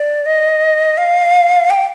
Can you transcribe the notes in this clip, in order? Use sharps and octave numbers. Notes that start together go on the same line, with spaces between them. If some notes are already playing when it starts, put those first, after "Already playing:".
Already playing: D5
D#5
F5
G5